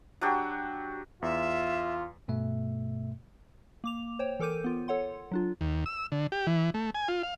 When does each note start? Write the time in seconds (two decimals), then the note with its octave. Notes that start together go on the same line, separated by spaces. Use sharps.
0.21 F#3 D4 F#4 G4
1.22 E2 F4 E5
2.28 G2 B2 A3 E5
3.84 A#3 D6 F7
4.19 C5 C#5 G5
4.39 E3 A4 A#4 D6 G6 D#7
4.64 B3 F4
4.88 A4 C#5 F#5 C6
5.31 F#3 D4 F4
5.61 D#2
5.86 E6
6.12 D3
6.32 G4
6.47 E3
6.74 A3
6.95 G#5
7.08 F4
7.23 F5